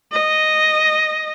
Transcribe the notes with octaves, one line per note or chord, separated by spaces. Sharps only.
D#5